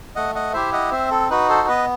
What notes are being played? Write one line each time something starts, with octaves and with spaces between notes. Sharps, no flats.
A3 D#5 F#5
D#5 F#5
E4 G4 C5 E5
D#5 F#5
C4 C5 E5
A4
D#4 F#4 B4
A4 C5
B3 B4 D#5